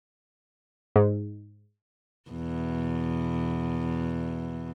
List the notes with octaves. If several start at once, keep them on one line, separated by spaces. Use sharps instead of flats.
G#2
E2 B2